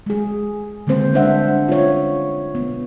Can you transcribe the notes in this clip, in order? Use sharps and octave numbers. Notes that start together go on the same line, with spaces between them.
G#3 G#4
D3 G#3 A#3 C4 C5
G3 G#3 D4 C5 E5 F#5
D4
F4 C#5
B3